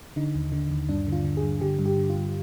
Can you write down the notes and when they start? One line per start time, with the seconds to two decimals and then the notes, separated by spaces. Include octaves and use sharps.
0.16 D3 D#4
0.35 D#2
0.52 D3
0.71 D#2
0.89 G2 D4
1.07 D3
1.12 F4
1.25 D3
1.37 G#4
1.43 G2
1.61 D3 G4
1.79 G2
1.85 G4
1.97 D3
2.10 F4
2.16 G2